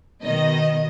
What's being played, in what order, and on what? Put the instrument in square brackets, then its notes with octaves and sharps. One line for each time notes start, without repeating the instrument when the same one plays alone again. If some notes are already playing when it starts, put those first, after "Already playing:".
[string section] B2 D#3 D#5